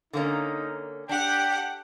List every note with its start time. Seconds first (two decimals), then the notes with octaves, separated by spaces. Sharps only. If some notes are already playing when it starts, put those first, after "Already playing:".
0.13 D3 A#3 C#4 D#4
1.09 D4 G4 F#5 G5